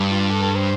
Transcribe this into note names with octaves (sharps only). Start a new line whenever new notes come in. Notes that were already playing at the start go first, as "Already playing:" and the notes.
Already playing: G2
F4
A4
A4
C5